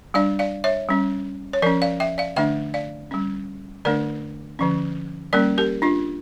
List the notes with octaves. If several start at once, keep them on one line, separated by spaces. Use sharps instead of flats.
G3 D4 D5 F5
D5 F5
C#5 E5
G3 C#4
C#5
F3 C#4 A#4 D5
D5 F5
E5 G5
D5 F5
D3 A3 D4 E5 G5
D5 F5
G3 C#4
D3 A3 D4 A#4 D5
D3 F3 C#4
G3 A#3 C#4 A#4 D5
G4 A#4
D4 F4